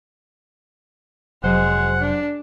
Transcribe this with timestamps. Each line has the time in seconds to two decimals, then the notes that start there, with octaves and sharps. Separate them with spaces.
1.44 F1 F#3 G#3 C5 F#5
2.01 D4